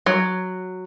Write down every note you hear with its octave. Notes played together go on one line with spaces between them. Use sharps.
F#3